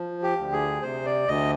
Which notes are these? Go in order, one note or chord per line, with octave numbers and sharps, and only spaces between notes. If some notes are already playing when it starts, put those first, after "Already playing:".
Already playing: F3
G4
D2
G#4
C3 C5
D5
D2 D#5